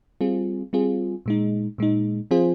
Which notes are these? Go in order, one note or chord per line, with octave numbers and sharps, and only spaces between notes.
G3 C4 F4 G#4
G3 C4 F4 G#4
A#2 G#3 D#4
A#2 G#3 D#4
F3 C4 F4 G#4 C5